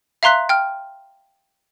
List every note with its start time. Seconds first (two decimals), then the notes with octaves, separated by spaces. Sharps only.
0.23 E5 F5 A#5 C6 F#6 B6
0.49 G5 F6